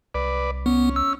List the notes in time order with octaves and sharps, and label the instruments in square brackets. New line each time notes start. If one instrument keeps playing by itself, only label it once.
[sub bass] C2 [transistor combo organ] B4 D5
[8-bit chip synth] B3 [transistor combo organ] C#4
[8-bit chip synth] E6